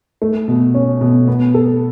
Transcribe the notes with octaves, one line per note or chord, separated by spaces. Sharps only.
A3
B2
C#4
B2
B3
A4